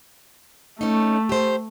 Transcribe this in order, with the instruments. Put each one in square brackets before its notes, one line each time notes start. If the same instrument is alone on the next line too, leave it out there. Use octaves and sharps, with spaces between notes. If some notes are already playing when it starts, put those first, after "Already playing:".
[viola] A3 [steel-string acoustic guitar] C#4 D#4
[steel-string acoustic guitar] G4 C5